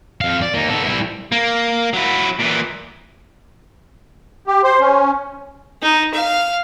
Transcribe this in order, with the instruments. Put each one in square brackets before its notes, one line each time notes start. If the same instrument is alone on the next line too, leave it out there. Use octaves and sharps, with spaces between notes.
[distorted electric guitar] F2 F5
D5
A#3 D#4
B3 A4
G3 E4
A#3
F#3 E4
A#2 E3
[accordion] G4
C5
C#4
[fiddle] D#4
F5